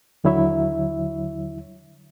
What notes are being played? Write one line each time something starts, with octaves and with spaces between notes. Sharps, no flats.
D#2 D3 F#3 E4 C#5 E5